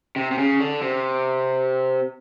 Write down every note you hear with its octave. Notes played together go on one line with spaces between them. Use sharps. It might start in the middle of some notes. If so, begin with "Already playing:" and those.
C3
C3
C#3
D3
C3